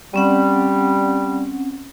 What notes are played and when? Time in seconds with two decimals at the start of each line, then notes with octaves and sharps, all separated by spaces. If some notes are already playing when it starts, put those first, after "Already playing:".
0.14 G3 C4 C#4 F#5